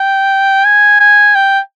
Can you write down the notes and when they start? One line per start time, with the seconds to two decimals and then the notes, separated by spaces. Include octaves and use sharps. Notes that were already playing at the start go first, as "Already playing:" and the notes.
Already playing: G5
0.65 G#5
1.00 G#5
1.35 G5